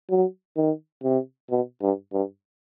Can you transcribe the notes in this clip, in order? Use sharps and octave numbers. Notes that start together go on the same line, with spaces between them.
F#3
D#3
C3
B2
G2
G2